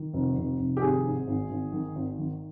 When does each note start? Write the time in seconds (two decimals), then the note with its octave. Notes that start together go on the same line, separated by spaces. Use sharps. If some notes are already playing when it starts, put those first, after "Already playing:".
Already playing: D#3
0.13 F1
0.37 F1
0.59 F1
0.77 G4
0.81 G#1 G#4
1.05 G#2
1.28 G#1
1.50 G#1
1.72 D#3
1.96 G#1
2.19 D#3